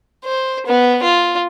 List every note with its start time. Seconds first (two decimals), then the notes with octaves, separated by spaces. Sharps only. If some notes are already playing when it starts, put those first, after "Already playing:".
0.24 C5
0.66 B3
1.03 F4